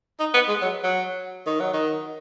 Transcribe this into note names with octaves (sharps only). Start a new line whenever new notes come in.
D#4
B3
G#3
F#3
F#3
D#3
F#3
D#3